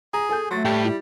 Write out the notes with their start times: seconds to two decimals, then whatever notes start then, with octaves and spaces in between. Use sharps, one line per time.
0.13 G#4 A#5
0.29 A4 G#5 G6
0.51 F#3 A3 C6 A6
0.65 A2 G3 G5
0.84 E4